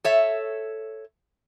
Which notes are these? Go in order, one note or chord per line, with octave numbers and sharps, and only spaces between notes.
A4 C#5 E5